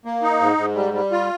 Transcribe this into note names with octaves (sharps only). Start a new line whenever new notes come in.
A#3
D#4
G#2
G#2
G3
G3
F4